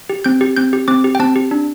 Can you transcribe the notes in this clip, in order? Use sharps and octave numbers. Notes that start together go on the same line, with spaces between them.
G4
C4 G6
G4
C4 G6
G4
C4 D6
G4
G5
C4 A5
G4
D4